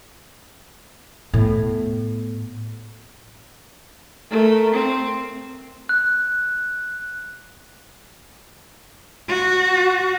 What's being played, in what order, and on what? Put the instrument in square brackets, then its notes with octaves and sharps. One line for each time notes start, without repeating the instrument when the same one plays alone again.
[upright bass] A2 B3
[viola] A3 A#4
C4
[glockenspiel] F#6
[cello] F#4